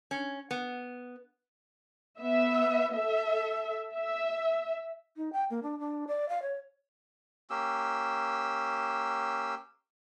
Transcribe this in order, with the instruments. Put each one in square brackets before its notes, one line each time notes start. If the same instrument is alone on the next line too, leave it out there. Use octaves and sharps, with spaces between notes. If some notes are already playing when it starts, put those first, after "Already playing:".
[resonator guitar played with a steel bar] C#4
B3
[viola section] B3 E5
A4 E5
E5
[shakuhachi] D#4
G5
A#3
D4
D4
D5
F5
C#5
[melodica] A#3 C#4 G4 E6